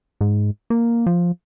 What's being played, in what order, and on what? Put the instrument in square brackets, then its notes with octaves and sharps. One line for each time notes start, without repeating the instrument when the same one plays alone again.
[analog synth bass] G#2
A#3
F3